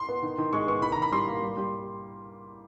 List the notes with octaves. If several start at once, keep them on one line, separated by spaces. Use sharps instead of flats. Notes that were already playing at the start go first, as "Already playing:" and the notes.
Already playing: C6
B3
D#3
D#3
G#3 C#6
B3 C#6
D#3 B5
A#5
D#3 B5
G3 C6
A#3
G3
G3